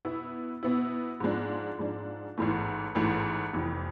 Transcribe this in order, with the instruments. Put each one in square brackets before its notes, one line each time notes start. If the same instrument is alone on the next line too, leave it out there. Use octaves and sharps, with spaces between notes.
[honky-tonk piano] B2 B3 E4
B2 B3 E4
G#2 F3 G#3 D4
G#2 F3 G#3 D4
A1 G#2 E3 A3
A1 G#2 E3 A3
F1 F2 E3